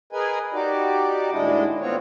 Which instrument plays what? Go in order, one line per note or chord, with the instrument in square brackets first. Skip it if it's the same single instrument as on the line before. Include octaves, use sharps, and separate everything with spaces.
[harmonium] G#4 A#4 B4 D#5 G#5
D#4 F#4 G4 D5
D#2 A2 G#3 D4 E4 D#5
D3 B3 C4 F4 F#4 C#5